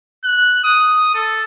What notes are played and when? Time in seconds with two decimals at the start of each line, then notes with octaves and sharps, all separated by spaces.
0.24 F#6
0.64 D#6
1.14 A4